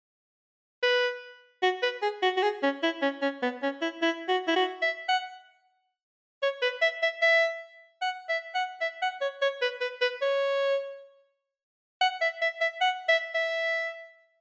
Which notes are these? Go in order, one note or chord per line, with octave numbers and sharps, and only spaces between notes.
B4
F#4
B4
G#4
F#4
F#4
G#4
C#4
E4
C#4
C#4
B3
C#4
E4
E4
F#4
E4
F#4
E5
F#5
C#5
B4
E5
E5
E5
F#5
E5
F#5
E5
F#5
C#5
C#5
B4
B4
B4
C#5
F#5
E5
E5
E5
F#5
E5
E5